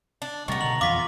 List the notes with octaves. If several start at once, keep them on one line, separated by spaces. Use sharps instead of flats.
D4
C3 D#3 G3 A#3 B3 C#6 A6 A#6
B2 D3 A#5 F#7
F2 E3 F4 D6 B6